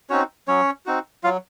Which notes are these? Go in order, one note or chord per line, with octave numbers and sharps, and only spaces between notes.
C4 C#4 D#4 F#4 C#5
F#3 C#4 C#5
C4 D#4 F#4
F#3 F4 F5